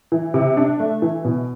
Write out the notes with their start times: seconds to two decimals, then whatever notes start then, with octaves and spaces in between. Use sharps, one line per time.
0.12 E3
0.34 C3
0.57 D4
0.80 A3
1.02 E3
1.25 B2